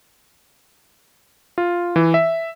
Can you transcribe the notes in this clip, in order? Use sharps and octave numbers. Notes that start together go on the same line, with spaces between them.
F4
E3
E5